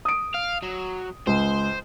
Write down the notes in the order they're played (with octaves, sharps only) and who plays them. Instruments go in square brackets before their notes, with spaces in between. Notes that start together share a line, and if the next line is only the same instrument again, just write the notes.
[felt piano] D#6 D7
[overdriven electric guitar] F5
F#3
[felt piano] C#2 [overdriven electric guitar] C5